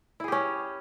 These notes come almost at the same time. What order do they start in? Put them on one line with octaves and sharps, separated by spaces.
E4 G#4 G4 C#4